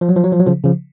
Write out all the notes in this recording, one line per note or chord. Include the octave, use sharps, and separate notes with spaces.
F3
F#3
F3
F#3
F3
F#3
C#3 F3
C#3 F3